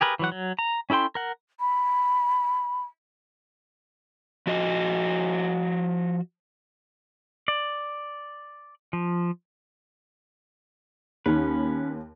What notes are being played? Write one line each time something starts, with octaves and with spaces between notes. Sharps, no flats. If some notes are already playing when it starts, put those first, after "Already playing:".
G4 G#4 A#4 B4
E3 F#3 F#5
F#3
A#5
C#4 E4 A4 G5 C6
A#4 F#5
B5
F3 F#4 D#5
D5
F3
D#2 D#3 C#4 B4